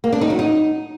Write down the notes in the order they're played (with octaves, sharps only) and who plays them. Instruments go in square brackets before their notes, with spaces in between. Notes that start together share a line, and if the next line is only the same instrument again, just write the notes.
[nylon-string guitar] A#3
D4
D#4
F#3
D#4